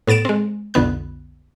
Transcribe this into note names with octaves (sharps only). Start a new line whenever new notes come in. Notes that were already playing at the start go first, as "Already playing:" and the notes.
A2 B3 A6 D7 E7
G#3 C4
B1 F2 D3 B3 F#6